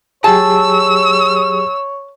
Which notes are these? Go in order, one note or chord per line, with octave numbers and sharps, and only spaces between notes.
F#3 G4 G#4 C#5 A5 E6